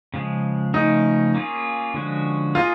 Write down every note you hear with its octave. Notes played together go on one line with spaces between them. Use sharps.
C#3 F3 G#3
C#3 F3 A3 C#4 D#4
A#3 C#4 F4 G#4
D3 F3 G#3 C#4 F#4
A#3 D#4 F4 G#4